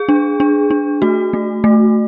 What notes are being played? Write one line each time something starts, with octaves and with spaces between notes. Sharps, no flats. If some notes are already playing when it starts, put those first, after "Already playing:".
Already playing: G#4
D4
D4
D4
A3 F#4
A3
A3